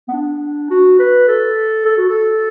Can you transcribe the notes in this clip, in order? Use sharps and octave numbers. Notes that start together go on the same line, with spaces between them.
B3
D4
F#4
B4
A4
A4
F#4
A4